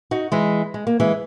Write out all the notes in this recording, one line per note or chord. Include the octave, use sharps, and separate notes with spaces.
D#4 F#4
E3 G#3
G#3
A#3
E3 G#3